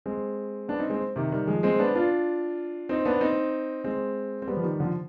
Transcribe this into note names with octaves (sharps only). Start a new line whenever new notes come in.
G#3 C4
B3 D4
C4 D#4
G#3 C4
C3 D#3
D#3 G3
F3 G#3
G#3 C4
B3 D4
D4 F4
C4 D#4
B3 D4
C4 D#4
G#3 C4
C4
G3 B3
F3
D#3 G3
D3 F3